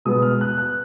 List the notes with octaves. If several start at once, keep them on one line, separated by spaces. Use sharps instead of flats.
B2 G#3 B3 D#6
F6
F#6
F#6